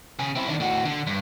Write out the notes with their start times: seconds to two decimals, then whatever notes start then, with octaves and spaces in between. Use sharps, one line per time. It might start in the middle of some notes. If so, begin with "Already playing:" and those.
0.19 C#3 G#4
0.36 C4 E4
0.48 D#3 D4
0.60 A2 F#4
0.85 D3
1.07 G2